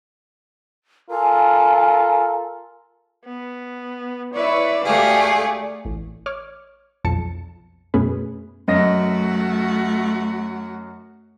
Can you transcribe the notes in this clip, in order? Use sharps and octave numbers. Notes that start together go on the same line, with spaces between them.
F4 A4 A#4 G#5
B3
E4 B4 C#5 D5
D2 A3 G4 G#4 F5
A1
C#5 D6 F6
B1 F2 A5 C#7
F#2 B2 A3 C#4 G#4 B4
F#2 A3 F#4 D#5 A#6